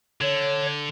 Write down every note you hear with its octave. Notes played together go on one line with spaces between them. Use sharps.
D3 C#5